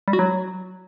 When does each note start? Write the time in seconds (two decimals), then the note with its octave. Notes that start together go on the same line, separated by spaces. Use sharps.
0.08 G3
0.13 F#4
0.19 F#3